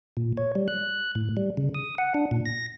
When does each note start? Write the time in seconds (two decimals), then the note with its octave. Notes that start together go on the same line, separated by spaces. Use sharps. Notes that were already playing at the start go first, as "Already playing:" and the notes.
0.17 A#2
0.37 C#5
0.55 G3
0.68 F#6
1.15 A2
1.37 G3
1.57 C#3
1.75 D#6
1.98 F#5
2.14 D4
2.31 A#2
2.46 A#6